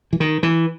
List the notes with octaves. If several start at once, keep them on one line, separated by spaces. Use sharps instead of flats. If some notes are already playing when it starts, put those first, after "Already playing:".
E3
D#3
E3